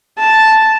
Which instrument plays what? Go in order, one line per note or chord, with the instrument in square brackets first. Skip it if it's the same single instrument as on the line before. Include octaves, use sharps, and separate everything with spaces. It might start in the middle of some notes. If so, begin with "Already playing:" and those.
[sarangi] A5